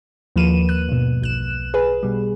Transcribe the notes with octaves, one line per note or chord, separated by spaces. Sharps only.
D#2 F3 A#3 B4 D#7 E7
F#6
G2 B2
B1 F#6 E7
G#4 B4
B2 G3